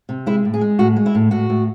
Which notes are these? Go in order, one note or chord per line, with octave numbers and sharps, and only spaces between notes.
C3
G#3 E4
A2
G#4
G#3
A2 F#4
G#3
E4
A2
A2 F#4
A2